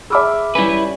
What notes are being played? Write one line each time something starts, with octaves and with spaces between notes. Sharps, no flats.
G#4 E5 B5 D6 E6 F6
G3 C#4 E4 B4 G#5